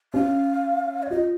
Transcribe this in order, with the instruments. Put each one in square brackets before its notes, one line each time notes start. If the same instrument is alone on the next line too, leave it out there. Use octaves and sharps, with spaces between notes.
[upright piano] C#4 [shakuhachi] F5
[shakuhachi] C#5
[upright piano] F4 [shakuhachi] D#5